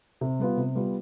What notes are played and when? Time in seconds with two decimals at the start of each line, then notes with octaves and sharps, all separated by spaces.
0.21 C3
0.39 G3 B3 F4
0.57 C3
0.75 G3 B3 F4